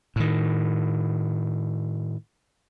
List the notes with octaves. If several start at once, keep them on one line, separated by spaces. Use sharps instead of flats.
A2 D#3